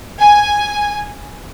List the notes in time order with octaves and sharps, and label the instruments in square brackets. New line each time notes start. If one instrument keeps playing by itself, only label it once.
[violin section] G#5